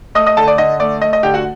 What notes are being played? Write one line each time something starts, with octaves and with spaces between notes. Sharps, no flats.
A3 D#5 D#6
D#5 D#6
D3 A4 A5
D5
D3 D#5
A3 D5
A3 D#5
D#5
D3 G4 G5
F#4 F#5